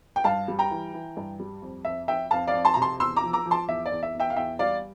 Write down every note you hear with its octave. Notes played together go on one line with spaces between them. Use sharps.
G5
G2 F5 A5
G3
G5 A#5
E3
E3
G2
G3
F2
F2 E5
F2 E5 G5
F2 F5 A5
D5 F5
F2
A5 C6
C3 A#5
A5 C6
E2 C6 E6
A#5 D6
F3
A#5 D6
F3
A5 C6
E2 E5
D5
E2
E5
E2
E5 G5
F5
E2 E5 G5
G3 D5 F5